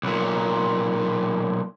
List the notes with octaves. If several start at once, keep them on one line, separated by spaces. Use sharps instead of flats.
B1 A#2